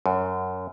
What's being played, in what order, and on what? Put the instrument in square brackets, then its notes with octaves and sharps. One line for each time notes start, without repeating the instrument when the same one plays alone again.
[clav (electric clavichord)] F#2